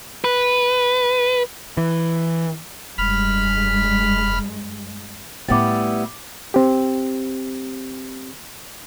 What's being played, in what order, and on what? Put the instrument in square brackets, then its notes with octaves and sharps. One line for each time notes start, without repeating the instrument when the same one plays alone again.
[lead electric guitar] B4
[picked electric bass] E3
[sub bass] F1 [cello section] G2 G#3 [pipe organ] B5 F6
[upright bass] A2 A3 [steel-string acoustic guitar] G3 B3 E4 [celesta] D6 A6
[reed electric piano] C4 G4